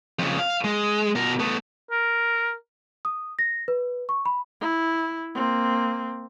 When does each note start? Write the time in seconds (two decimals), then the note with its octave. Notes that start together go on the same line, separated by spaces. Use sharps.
0.19 F2 C#3
0.39 F5
0.64 G#3
1.15 B2 A#4
1.40 A3 B3
1.91 A#4
3.05 D#6
3.39 A#6
3.68 B4
4.09 C#6
4.26 B5
4.61 E4
5.35 A#3 C4